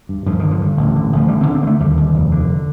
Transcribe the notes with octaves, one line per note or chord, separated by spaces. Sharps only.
G2
G2 F3
D3 D#3
F3
G2
A1
D3
A1 F3
D3 G3
C4
D3
C4
D3 A3 A#3
D#2 G3
D#2
F1
D3